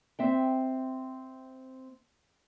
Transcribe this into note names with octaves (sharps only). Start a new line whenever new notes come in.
C4 E5 G5